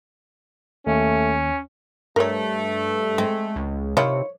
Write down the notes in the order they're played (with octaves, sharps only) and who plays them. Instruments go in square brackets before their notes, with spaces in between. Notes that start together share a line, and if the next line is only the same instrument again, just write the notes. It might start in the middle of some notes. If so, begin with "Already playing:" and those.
[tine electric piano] D#2 [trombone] A3 [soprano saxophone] C#4
[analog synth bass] G2 [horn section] A3 [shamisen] A#4 C#5
[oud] G#3 [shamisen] C4
[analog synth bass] C#2
[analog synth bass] C3 [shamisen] D#3 E4 F4 [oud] C#5